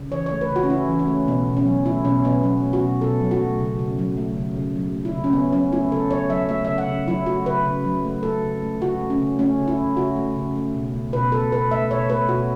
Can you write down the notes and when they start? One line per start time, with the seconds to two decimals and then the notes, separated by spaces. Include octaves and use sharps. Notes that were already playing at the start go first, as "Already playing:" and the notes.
Already playing: C#3
0.11 E3 C#5
0.26 C#5
0.32 A3
0.41 B4
0.50 C#3
0.56 F#4
0.63 C#4
0.69 C#3 E4
0.89 E3
0.99 C#4
1.08 A3
1.27 B2 B3
1.47 B2
1.57 C#4
1.66 F#3
1.85 A3 E4
2.05 B2 C#4
2.24 B2 B3
2.43 F#3 C#4
2.63 A3
2.73 F#4
2.83 B2
3.01 B2 A4
3.21 F#3
3.31 F#4
3.41 A3
3.60 C#3
3.79 C#3
3.99 F#3
4.17 A3
4.37 C#3
4.57 C#3
4.76 F#3
4.94 A3
5.05 E4
5.14 C#3
5.24 C#4
5.33 C#3 B3
5.53 F#3 C#4
5.72 A3 E4
5.91 C#3 A4
6.11 C#3 C#5
6.30 F#3 E5
6.49 A3 E5
6.65 C#3 E5
6.78 F#5
6.88 C#3
7.08 F#3 E4
7.26 A3 F#4
7.45 C#3 B4
7.65 C#3
7.84 F#3
8.05 A3
8.23 A3 A4
8.43 C#3
8.62 A3
8.82 C#3 F#4
9.00 A3
9.10 C#4
9.20 C#3
9.39 A3 C#4
9.58 C#3
9.68 E4
9.78 A3
9.97 C#3 F#4
10.16 A3
10.36 C#3
10.56 A3
10.74 B2
10.93 A3
11.13 B2 B4
11.32 A3 A4
11.51 B2 B4
11.71 A3 E5
11.91 B2 C#5
12.10 A3 B4
12.29 B2 F#4